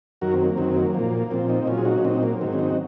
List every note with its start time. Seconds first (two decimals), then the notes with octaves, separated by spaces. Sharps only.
0.21 F#2 D#3 F#3 F#4 A#4
0.33 C4
0.45 A#3
0.57 F#2 D#3 F#3 C4
0.76 A#3
0.94 A#2 F3
1.31 A#2 F3 C4
1.49 C4 D#4
1.67 A#2 F#3 C#4 F4
1.78 G#4
1.85 D#4 F#4
1.98 C#4
2.05 A#2 F#3 C4 D#4
2.23 A#3
2.41 G#2 D#3 F#3 C4
2.53 C#4
2.59 C4 D#4
2.70 F#4